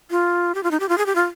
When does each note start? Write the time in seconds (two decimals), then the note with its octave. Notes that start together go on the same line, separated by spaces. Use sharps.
0.11 F4
0.55 G4
0.63 F4
0.71 D#4
0.80 G4
0.89 F4
0.98 G#4
1.06 G4
1.15 F4